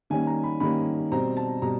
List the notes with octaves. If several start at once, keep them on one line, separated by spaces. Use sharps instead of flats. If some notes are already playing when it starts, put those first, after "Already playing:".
D#3 G3 A#3 C#4 G#5
A#5
B5
D#3 G3 A#3 C#4 B5
B2 G3 C4 A#5
A5
B2 G3 A#5